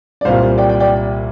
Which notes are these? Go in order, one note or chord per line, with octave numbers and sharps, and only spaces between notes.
D5
C2 A#2 G3 C5 F5
D5 G5
D5 G5
D5 G5